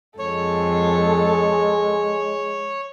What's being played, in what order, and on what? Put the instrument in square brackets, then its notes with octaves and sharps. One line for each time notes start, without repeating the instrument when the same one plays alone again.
[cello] F2 [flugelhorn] G#3 [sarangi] A4 [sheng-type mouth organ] C#5